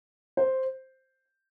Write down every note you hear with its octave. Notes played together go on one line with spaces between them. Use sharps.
C5